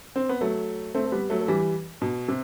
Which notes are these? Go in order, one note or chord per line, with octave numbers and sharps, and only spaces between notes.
C4
B3
F#3 A3
A3 C4
A3
G3 B3
F#3 A3
A3
E3 G3
B2
C3